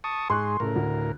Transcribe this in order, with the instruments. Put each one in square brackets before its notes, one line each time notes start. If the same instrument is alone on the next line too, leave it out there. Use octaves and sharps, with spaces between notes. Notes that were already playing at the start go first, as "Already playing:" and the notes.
[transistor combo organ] A5 C#6 D#6
[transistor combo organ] G#2 G#4 [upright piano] C6 C#6 F#6
[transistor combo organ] A2 A#4 [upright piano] C#3 A4
[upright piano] D2